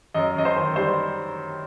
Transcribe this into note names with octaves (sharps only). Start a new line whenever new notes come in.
F#2 D#5
F#2 D#5
C5
D#3
G3 C5